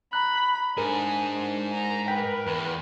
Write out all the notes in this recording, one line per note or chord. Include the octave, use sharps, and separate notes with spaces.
A#5 B5 F#6
G#2 D4 G#4 A#4
A#5
A#4 B4 G5 B6
E2